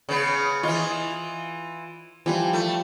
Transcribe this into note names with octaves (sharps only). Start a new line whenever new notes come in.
C#3 B3
E3 F4 D#5
E3 F3 G3 F4
A3